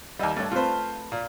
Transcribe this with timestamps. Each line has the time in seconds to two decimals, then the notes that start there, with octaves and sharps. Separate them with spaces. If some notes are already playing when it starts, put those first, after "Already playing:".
0.19 D#2 G3 D#5 E5 F#5
0.36 G2 A3 A4 C#5
0.51 A3 C4 F4 B4 C5
1.12 A#2